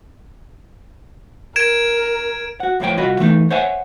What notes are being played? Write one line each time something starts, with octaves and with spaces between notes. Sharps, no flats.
A#4 G#6 D7 E7
F#4 F#5
E2 A2 E3 F3 C#5 G5
C2 F4 F#4 D#5 B5
E3 A3 D4 D#4
C5 C#5 E5 F#5 G#5